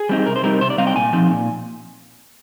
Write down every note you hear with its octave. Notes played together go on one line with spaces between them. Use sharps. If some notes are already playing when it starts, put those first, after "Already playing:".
Already playing: G#4
G3 C4 D#4
C3 A#4
C5
G3 C4 D#4 A#4
C3 C5
D5
G3 C4 D#4 F5
G5
A#2 G#5
F3 C4 D#4
A#2